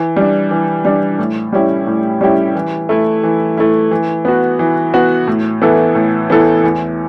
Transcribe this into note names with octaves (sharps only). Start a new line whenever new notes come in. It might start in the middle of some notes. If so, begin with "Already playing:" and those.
Already playing: E3
G3 D4
E3
G3 D4
A2
G3 C#4 E4 G4
A2
G3 C#4 E4 G4
E3
A3 E4
E3
A3 E4
E3
B3 F#4
E3
B3 F#4
A2
E3 B3 E4 A4
A2
E3 B3 E4 A4
E2